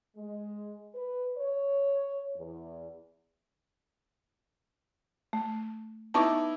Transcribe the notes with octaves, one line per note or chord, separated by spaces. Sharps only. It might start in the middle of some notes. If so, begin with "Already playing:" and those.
G#3
B4
C#5
E2
A3
B3 D#4 E4 A5 C#6 D6